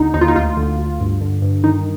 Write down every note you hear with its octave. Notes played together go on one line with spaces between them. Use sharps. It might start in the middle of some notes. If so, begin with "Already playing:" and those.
Already playing: D#2 D3 D#4
D#2 D#4
F4
D#4
D2 F4
D3
D2
G2
D3
G2
D#3 D#4